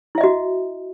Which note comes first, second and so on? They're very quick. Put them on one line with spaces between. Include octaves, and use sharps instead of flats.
E4 E5 D#5 F#4